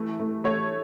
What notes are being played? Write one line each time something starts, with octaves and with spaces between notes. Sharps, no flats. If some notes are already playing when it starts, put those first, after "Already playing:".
Already playing: E3 A3
A3
A3 C#5